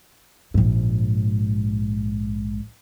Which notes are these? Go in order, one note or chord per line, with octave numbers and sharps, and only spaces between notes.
A#1 G#2